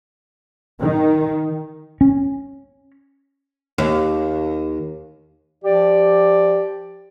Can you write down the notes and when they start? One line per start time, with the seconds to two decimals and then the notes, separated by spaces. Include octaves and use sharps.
0.82 D#3
2.01 C#4
3.78 D#2
5.65 F3 G4 D5